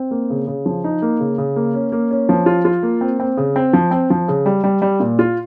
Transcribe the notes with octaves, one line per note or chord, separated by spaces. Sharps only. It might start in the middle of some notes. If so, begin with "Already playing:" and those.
Already playing: C4
A#3
C#3
C#3
F3
D#4
A#3
C#3
C#3
A#3
C#4
A#3
C#4
F3
F4
F4
A#3
C4
C4
C#3
C4
F3
C4
F3
C#3
G3
G3
G3
A#2
F4